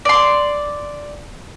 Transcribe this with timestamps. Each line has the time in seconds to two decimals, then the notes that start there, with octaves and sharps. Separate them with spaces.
0.05 D5 C6